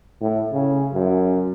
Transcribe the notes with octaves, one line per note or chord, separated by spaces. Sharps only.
A2
C#3
F#2